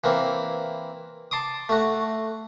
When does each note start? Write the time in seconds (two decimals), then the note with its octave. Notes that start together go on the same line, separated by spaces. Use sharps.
0.04 E3 A#3 C4
1.31 A5 C6 D6 D#6
1.69 A3 F#4